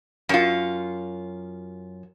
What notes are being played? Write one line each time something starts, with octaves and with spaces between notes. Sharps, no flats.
F#2 F4